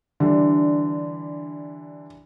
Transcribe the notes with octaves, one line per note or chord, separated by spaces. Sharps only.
D3 E3 G3 D4